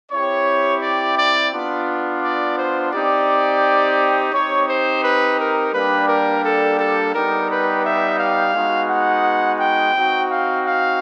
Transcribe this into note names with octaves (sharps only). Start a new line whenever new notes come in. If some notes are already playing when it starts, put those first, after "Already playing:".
C4 E4 G4 C#5
D5
D5
B3 D4 F4
D5
C5
C4 D#4 G4 D5
C4 D#4 G4 C#5
C5
B4
A#4
G3 A#3 D4 G4 B4
A#4
A4
A4
G3 B3 D#4 G4 A#4
B4
E5
F5
G#3 B3 D#4 F#4
F#5
G5
C4 D#4 F#4
F5
F5